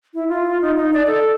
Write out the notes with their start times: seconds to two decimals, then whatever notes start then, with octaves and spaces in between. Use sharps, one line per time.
0.14 E4
0.29 F4
0.62 D#4
0.77 D#4
0.94 D5
1.07 A4